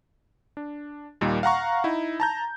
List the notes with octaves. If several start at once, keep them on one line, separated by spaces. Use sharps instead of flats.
D4
D#2 A#2 G3 A#3 D#4
F5 F#5 A#5 C#6
D#4 E4
A5 A#5 G6